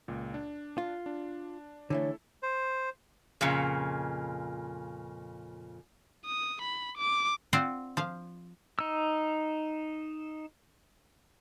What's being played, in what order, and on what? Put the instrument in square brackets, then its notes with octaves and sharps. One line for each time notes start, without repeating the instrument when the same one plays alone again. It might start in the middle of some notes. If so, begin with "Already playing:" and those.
[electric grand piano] C#2 A#2
D4
[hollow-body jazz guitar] F4
[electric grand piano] D4
[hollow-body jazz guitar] D3 E3 A3 [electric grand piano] E4 A4 [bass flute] C#5
[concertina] C5
[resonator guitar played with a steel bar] F2 A#2 C#3
[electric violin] D#6
B5
D6
[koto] C4 F4 C5 D5 F5 F#5
F3 F5
[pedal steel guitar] D#4 E6